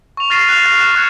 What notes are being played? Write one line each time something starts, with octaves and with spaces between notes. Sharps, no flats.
C#6 F7
F6 A6 A#6 C7 D#7 E7
F#6 F7
F6 A6
F#6 E7
C#6 F#6 G#6 C#7 E7